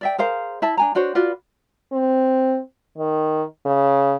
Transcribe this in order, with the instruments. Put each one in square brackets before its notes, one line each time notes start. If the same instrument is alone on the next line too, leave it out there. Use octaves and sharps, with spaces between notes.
[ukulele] D5 E5 G5
G#4 A#4 C5 F5
E4 E5 A5
D4 G#5 A#5
D4 F#4 C5 C#5
F4 F#4 B4 D5
[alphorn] C4
D#3
C#3